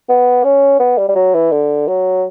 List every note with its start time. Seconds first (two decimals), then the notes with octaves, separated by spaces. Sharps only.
0.09 B3
0.44 C#4
0.79 B3
0.98 G3
1.09 G3
1.15 F#3
1.34 E3
1.52 D3
1.88 F#3